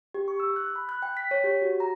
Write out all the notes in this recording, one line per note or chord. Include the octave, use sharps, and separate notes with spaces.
G4
C#6
E6
F#6
B5
F#6
G5
B6
C#5
G4
F#4
A#5